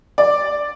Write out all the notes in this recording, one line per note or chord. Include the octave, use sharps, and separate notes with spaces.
D5